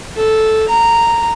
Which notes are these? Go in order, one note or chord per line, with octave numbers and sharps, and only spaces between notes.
A4
A#5